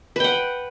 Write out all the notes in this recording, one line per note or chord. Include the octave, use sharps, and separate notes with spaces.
B4 F#5 G5